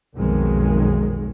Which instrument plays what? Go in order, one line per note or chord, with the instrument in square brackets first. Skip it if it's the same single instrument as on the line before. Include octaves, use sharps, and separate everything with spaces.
[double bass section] B1 F2 D#3 G#3